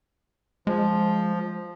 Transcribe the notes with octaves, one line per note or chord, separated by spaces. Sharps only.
F3 G#3